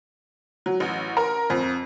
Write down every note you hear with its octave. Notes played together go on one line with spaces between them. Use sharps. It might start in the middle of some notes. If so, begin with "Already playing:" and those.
F#3
A1
A#4
F2